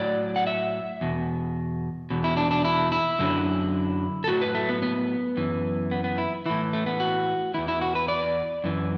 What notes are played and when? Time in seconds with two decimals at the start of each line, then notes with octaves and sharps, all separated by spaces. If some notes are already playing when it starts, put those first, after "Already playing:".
Already playing: A2 F#3 D5
0.36 F#5
0.47 E5
1.01 E2 B2
2.10 E2 B2
2.24 E4
2.37 D4
2.51 D4
2.65 E4
2.92 E4
3.19 F#2 D3 F#3
4.24 A4
4.27 A2 F#3 F#4
4.41 B4
4.55 A3
4.69 B3
4.82 B3
5.37 F#2 E3
5.91 B3
6.04 B3
6.18 E4
6.46 A2 E3 E4
6.73 A3
6.86 B3
7.00 F#4
7.54 E2 E3 E4
7.68 E4
7.81 F#4
7.95 B4
8.08 D5
8.64 F#2 E3